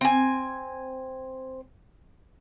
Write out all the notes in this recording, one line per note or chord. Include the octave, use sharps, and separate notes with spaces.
C4 G#5